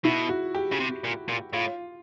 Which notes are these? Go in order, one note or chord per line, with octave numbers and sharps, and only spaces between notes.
B2 E4
F#4
G4
C#3
C3
A#2
A#2
A2 F4